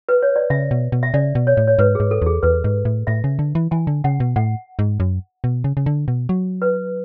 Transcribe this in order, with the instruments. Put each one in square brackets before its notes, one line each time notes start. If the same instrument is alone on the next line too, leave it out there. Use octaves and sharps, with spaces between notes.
[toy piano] B4
C#5
D5
[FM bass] C#3 [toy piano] E5
[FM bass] B2
B2
[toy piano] E5
[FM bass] C#3 [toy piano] D5
[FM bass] B2
[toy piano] C#5
[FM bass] A2
[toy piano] C#5
[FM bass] G#2 [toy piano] B4
[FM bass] G#2 [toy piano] G#4
[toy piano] A4
[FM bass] E2 [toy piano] G#4
[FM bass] E2 [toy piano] B4
[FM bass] G#2
A2
[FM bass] A2 [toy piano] E5
[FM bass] C#3
D3
E3
[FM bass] E3 [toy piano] G#5
[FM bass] D3
[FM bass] C#3 [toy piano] F#5
[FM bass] B2
[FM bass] A2 [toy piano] F#5
[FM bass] G#2
F#2
B2
C#3
C#3
D3
B2
F#3
[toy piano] B4